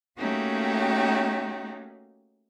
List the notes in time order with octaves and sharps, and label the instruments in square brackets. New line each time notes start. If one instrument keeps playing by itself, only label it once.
[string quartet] A3 A#3 C#4 D#4 F#4 G4